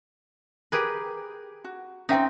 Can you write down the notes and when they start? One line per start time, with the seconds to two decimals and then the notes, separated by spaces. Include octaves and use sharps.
0.72 G4 G#4 A#4 B4
1.64 F#4
2.09 C4 C#4 D#4 E5 G5